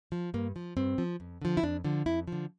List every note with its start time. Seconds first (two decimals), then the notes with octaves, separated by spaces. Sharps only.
0.12 F3
0.34 G2 A#3
0.56 F3
0.77 G2 C4
0.98 F3
1.20 F2
1.42 D3 F3
1.57 E4
1.63 F2 D4
1.84 D3 F3
2.06 F2 E4
2.28 D3 F3